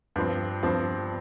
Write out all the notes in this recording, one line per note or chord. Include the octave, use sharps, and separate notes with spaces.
G2 F3 C4
G2 F3 C4